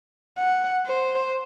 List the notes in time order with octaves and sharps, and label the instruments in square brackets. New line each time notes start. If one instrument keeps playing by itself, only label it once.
[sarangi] F#5
C5